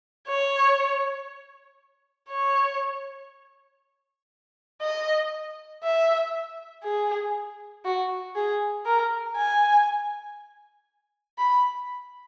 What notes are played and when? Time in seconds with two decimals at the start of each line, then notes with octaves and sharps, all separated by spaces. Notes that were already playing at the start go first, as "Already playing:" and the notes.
0.28 C#5
2.30 C#5
4.82 D#5
5.84 E5
6.84 G#4
7.85 F#4
8.36 G#4
8.86 A#4
9.37 G#5
11.39 B5